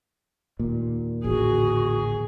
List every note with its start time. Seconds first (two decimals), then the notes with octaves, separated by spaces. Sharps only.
0.59 D#2 A#2
1.24 A1 D3 F#4 G#4